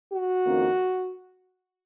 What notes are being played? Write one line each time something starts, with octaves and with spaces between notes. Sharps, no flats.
F#4
F2 D#3 A#3 C#4